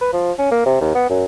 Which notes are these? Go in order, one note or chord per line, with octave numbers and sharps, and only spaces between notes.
B4
F3
C#4
A#3
C3
D#2
B3
F#2